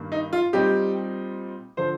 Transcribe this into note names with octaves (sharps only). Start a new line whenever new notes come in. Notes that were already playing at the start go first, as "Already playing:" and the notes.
Already playing: G2 D#3 G3 A#3
D#4
F4
A#2 G3 C4 D#4 G4
D3 F3 C5